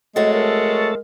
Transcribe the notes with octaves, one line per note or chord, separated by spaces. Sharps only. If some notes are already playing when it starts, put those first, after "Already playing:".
F2 G#3 A3 F#4 A4 C#5 D#5
A#4